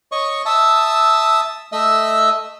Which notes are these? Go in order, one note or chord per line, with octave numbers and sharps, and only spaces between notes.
C#5 D#5 C#6
E5 A5 D#6 E6
A3 D#5 E5 E6